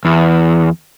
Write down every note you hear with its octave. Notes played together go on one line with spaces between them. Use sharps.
E2